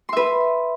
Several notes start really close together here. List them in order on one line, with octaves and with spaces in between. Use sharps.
C6 E5 B4